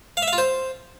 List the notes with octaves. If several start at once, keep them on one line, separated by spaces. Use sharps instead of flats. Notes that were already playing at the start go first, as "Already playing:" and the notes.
F5
E5
F5
F4
C5